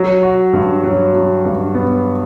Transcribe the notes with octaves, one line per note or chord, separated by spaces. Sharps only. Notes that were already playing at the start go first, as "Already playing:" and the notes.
Already playing: F#3
F#4
G2
F#3
F#3
G2
B3